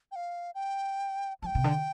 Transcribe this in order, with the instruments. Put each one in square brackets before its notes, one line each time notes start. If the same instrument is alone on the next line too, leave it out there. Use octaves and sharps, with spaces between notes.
[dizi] G5
F5
G5
[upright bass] F3 [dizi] A5
[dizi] G5
[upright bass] C3
D3